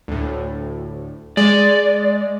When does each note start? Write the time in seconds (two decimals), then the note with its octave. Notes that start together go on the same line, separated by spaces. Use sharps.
0.08 D2 A2
1.37 G#3 D5